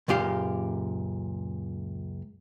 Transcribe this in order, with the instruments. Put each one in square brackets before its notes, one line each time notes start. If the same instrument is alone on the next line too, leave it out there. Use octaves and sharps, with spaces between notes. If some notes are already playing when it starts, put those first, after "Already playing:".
[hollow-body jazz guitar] C#2 F#2 A#2 G4 F5